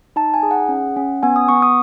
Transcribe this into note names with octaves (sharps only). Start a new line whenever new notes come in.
D#4 A5
G#5
G#4
F#5
C#4
C#4
B3 G#5
D#6
B3 C#6
D#6